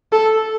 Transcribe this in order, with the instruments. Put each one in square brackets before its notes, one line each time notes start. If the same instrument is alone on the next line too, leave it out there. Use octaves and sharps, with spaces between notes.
[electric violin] A4